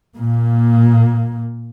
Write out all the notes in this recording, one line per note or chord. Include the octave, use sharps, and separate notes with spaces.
A#2 A#3